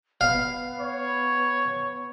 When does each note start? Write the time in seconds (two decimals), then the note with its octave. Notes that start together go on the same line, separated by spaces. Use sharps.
0.21 B3 F5
0.80 C#5